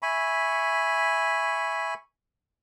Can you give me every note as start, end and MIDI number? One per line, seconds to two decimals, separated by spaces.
0.02 1.94 76
0.02 1.94 80
0.02 1.94 83
0.02 1.94 85